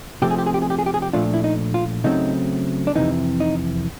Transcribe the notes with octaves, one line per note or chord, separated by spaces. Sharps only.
C3 F3 A3 C4 G4
G#4
G4
G#4
G4
G#4
G4
G#4
G4
G#4
G4
A#2 F3 A3 D4 F4
E4
D#4
F4
C#3 F#3 A3 C4 D#4
D4
F2 C3 E3 D#4
D#4